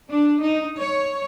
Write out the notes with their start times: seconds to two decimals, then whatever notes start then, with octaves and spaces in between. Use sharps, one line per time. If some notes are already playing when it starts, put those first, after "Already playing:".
0.11 D4
0.43 D#4
0.79 C#5